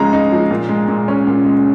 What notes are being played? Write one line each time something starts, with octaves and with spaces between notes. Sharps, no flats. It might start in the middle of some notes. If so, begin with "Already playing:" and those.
Already playing: C#3 F3 G#3 A#5
D#4
F3
A#2
G#3
A#2
C#4
A#2
G#3